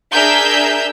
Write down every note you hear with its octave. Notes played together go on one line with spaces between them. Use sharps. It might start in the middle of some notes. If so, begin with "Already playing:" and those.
D4 G#4 A#4 E5 E6 G6